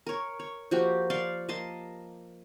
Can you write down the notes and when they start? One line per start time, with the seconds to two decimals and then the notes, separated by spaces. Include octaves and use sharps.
0.07 A#4 C#5
0.39 C#5
0.71 F3 A#3 F#4 G4
1.10 D5 F5 C6 C#6
1.48 A#3 D#5 A5 C6